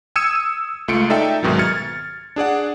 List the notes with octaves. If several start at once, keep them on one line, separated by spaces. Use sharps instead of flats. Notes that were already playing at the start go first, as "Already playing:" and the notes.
D#6 E6 G#6 C#7 D#7 E7
C#2 A3 F4 C#7 D7
D#4 A4 D5 E5 G5
C2 G#2 B2 D#3 F#3
F6 G#6 A6 C#7
D4 G#4 D5 F#5